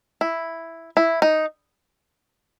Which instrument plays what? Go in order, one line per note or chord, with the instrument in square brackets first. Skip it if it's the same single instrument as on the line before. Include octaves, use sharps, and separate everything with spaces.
[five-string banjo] E4
E4
D#4